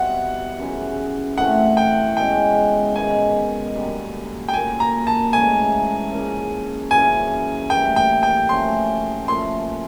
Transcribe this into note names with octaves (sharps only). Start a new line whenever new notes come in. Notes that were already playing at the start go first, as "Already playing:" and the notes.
Already playing: B2 G3 C4 E4 F#5
F#2 C#3 E3
A2 E3 A3 C4 F#5
G5
B2 G#3 C#4 G5
D#3 G#3 B3 G#5
F#2 D3 G3 A#3
G5
A#2 F#3 A#3 G#5
A#5
A5
G#2 E3 A3 C#4 G#5
C#3 F3 A#3
F#2 C#3 E3 G#5
A2 E3 G3 A#3 G5
G5
G5
F3 A3 C#4 F#4 C6
A#2 F3 A3 C6